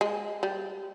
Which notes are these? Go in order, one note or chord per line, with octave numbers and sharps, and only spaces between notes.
G#3
G3